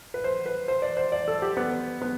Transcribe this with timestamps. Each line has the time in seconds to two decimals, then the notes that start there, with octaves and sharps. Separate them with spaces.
0.14 B4
0.24 C5
0.46 B4
0.68 C5
0.82 D5
0.97 C5
1.12 D5
1.28 A4
1.42 G4
1.57 B3
2.01 B3